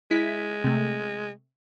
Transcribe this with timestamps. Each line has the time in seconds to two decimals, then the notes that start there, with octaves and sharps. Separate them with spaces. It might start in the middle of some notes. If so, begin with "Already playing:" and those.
0.11 G#3 E4 B6
0.64 C3 A3